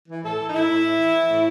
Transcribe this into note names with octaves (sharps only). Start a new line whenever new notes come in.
E3
A2 A4
E3
D#4
A2 E4
A2
A2
E3
E3
A2